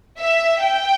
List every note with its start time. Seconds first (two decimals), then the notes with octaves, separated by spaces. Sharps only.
0.20 E5
0.62 G5